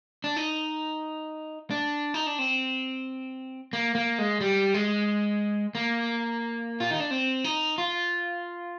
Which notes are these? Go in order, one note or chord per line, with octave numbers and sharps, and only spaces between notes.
D4
D#4
D4
D#4
D4
C4
A#3
A#3
G#3
G3
G#3
A#3
F4
D#4
D4
C4
D#4
F4